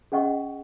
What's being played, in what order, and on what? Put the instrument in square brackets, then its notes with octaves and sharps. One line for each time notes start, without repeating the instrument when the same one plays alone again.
[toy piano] C#4 G#4 D#5 F#5 C#6